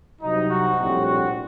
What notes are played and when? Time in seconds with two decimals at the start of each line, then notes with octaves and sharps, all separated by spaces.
0.22 C2 C3 F#3 D#4
0.50 F#4
0.78 A#1 A2 G3 C4
1.06 F#4